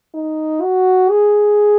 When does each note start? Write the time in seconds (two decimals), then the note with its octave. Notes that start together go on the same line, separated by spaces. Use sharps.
0.14 D#4
0.62 F#4
1.10 G#4